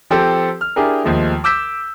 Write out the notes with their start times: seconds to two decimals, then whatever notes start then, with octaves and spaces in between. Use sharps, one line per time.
0.10 F3 C4 G4 A4 C5
0.61 F6
0.76 D4 E4 G4 G#4 A#4
1.04 D#2 F3 G#3 A3
1.44 D6 E6 G6 B6 E7